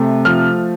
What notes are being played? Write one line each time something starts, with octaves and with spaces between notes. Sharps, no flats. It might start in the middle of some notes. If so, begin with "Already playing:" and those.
Already playing: C3 A3
F3 F6